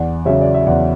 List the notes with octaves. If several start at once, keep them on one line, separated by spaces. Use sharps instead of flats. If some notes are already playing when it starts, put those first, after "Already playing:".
Already playing: E2 D5 F#5
C#3 F#3 C#5 E5
D5
E5
E2 D5 F#5